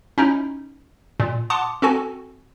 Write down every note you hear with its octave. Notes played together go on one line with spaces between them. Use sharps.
C#4 D#4 E4
A#2
F#5 A5 C6 D6 D#6
C4 F#4 A4 G#5